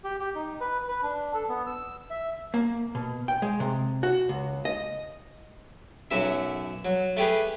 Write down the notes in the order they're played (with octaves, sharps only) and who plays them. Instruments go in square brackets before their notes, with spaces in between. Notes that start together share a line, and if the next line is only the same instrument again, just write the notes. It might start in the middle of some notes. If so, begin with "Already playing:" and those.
[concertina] G4
G4
D#4
B4
B4
D4
A4
B3
E6
E5
[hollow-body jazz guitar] A#3
B2
G5
G#3
C3
F#4
C#2
D#5
[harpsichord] B1 F#2 E5
F#3
A3 G4 G#4 B4